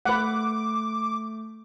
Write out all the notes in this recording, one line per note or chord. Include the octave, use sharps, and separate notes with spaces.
A3 B4 F#5 D6